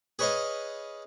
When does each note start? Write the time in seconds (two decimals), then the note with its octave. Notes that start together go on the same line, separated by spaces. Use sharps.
0.19 G#4 B4 C#5 D#5 F5